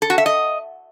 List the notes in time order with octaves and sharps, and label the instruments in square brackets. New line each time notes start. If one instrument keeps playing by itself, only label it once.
[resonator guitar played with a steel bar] A4
F#4
E5
D#5